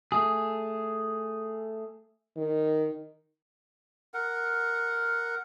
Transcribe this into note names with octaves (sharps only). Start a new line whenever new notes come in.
A3 G#4
D#3
A#4 F#5